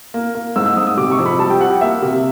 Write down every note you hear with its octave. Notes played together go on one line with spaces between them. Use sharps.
A#3
A#3
G#2 E6
E6
G#2 D#6
D#6
C3 D6
C#6
F2
B5
G3 A5
G5
G3 F#5
G5
A#3 E5
C3